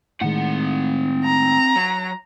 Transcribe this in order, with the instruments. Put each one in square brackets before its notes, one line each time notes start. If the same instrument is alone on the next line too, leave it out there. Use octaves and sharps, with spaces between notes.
[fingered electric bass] A2 D#3 G#3 [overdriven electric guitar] C4 F#5
[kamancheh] A#5
[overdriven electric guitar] F#3